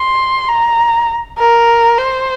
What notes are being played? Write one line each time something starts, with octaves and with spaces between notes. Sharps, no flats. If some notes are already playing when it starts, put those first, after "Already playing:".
Already playing: C6
A#5
A#4
C5